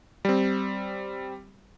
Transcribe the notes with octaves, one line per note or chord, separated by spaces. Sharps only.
G3 C4